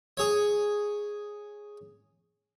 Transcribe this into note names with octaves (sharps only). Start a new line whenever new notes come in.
G#4 C#5